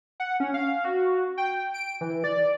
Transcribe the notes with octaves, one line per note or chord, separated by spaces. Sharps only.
F#5
C#4
F5
F#4
G5
D7
E3
D5